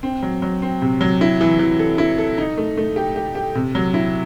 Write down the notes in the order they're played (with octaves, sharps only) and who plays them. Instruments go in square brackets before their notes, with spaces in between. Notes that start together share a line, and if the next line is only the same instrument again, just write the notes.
[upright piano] C4
F#3
F#3
C4
C3
F#3
E4
E3
E3
A4
E4
A4
D#4
A3
A3
G4
G4
G4
C3
F#3
E4